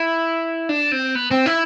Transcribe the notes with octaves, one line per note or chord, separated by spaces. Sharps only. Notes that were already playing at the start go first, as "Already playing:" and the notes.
Already playing: E4
D4
C4
B3
C4
E4